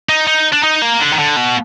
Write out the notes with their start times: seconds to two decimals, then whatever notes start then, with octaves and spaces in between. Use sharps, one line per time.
0.09 D#4
0.27 D#4
0.53 D4
0.63 D#4
0.82 A#3
1.00 D3
1.12 D#3
1.18 D3
1.36 B2